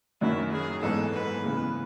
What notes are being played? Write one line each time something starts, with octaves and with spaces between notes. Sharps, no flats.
F#2 D#3 F#3 E4
G#4
G#2 E3 G#3 B3 A4
B4
C#3 E3 B3